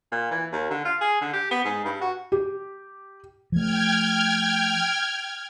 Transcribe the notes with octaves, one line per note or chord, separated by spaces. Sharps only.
A#2
E3
D#2
D3
F4
G#4
D3
G4
B3
G#2
G2
F#4
G4
F3 A3 G5 F6 G#6